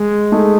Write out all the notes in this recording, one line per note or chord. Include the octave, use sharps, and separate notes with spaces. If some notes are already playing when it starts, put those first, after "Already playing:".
Already playing: G#3
A3 D#4 G#4